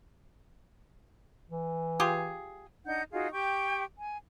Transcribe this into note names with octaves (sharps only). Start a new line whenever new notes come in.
E3
F4 G4 G#4
D4 D#4 F#5 G6
D#4 F4 F#4 G#4
G4 G5 C#6
G#5